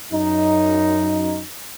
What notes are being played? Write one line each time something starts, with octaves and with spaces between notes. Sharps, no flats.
F#2 D#4